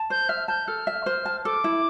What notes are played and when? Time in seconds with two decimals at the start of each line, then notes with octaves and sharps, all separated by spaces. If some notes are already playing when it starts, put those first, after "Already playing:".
Already playing: A5
0.10 C5 G6
0.29 E5 F6
0.48 A5 G6
0.68 A4 F6
0.87 E5
1.06 C5
1.26 A5
1.45 A4 D6
1.64 E4